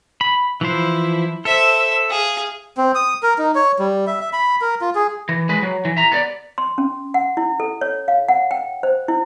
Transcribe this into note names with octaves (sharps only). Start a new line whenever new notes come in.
B5
E3 F3 E4 C5
A4 C5 E5
G#4 F5
C4
D#6
A#4
D#4
C#5
G3
E5
E5
B5
A#4
F4
G#4
E3
G#3 B4
F#3
E3
E5 A#5
B3 D5
C6
C#4
F#5
E4
A4
C#5
F5
F#5
G5
C5
E4